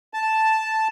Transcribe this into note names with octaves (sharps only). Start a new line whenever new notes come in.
A5